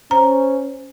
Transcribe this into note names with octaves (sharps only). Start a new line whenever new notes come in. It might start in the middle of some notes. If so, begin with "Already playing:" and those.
C#4 C5 A#5